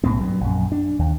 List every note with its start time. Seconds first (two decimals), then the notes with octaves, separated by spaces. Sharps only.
0.04 B1 A2 B3 C4
0.21 G2 F#3
0.41 A#1 F#2
0.72 D4
0.99 D#2